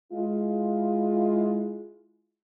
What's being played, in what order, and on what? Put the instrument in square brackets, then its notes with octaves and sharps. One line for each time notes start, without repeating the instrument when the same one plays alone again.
[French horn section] G#3 E4 F4